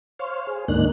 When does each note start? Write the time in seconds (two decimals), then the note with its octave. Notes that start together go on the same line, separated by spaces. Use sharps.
0.19 C5 C#5 F5
0.47 G#4
0.68 D2 G#2 A#3 D4 D#4 F#6